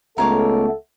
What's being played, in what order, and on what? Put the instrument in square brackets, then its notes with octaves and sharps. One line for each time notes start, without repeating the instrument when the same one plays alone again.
[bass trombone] C#2 [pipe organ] A3 B3 [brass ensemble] A4 [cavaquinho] A#4 C#5 D6